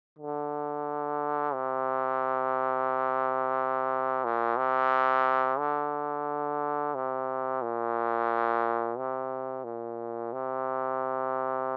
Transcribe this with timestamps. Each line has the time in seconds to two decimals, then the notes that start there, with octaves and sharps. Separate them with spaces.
0.19 D3
1.54 C3
4.25 A#2
4.58 C3
5.59 D3
6.95 C3
7.62 A#2
8.98 C3
9.64 A#2
10.33 C3